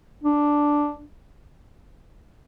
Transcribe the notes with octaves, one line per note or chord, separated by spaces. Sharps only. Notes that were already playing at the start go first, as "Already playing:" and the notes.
D4